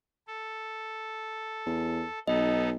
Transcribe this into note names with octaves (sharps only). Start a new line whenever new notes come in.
A4
E2
B1 B3 D#4 A4 D#5